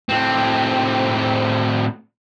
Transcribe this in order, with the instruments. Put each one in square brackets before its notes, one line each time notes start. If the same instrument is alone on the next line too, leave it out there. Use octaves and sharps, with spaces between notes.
[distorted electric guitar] A2 C4